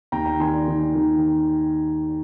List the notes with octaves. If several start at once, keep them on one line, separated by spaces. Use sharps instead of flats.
D#2 G5 A#5
G5 A#5
D#3 G#5 C6
D5
D#3
D#3